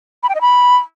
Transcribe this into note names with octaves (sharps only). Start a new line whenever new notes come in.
B5
G5
D#5
B5